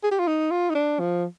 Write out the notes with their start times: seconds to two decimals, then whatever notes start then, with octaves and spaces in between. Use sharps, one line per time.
0.03 G#4
0.11 G4
0.19 F4
0.27 D#4
0.51 F4
0.70 D#4
0.75 D4
1.00 F3